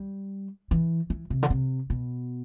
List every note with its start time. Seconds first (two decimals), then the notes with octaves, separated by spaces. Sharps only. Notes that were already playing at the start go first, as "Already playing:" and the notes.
Already playing: G3
0.71 E3
1.10 E3
1.30 C3
1.43 D3
1.50 C3
1.90 B2